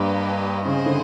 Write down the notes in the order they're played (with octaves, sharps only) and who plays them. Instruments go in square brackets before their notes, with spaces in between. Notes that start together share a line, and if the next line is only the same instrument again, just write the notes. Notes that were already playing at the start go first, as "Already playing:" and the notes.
Already playing: [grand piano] G2 [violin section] A#3 D4 G4 B4 D#5
[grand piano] C#3 [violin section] C4 E4 G#4 C5 D#5
[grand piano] D3